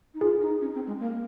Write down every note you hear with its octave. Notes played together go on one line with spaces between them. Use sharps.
D#4
F4 G#4
D#4
C#4
C4
G#3
A#3